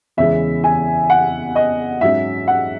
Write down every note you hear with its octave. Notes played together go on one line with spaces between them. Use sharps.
E2 C#3 E3 G#3 E5
G#5
F#5
D#5
G#2 F#3 C#4 E5
F#5